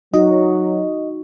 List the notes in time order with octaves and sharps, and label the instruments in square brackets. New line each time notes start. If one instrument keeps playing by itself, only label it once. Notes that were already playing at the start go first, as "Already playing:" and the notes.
[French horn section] F#3 [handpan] D#4 F#4 [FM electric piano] D#5